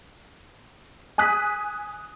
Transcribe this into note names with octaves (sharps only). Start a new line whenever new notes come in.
G#5 D#6 F#6 B6